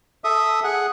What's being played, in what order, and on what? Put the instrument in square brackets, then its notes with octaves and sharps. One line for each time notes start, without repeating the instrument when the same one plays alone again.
[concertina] A4 E5 D#6
G#4 F#5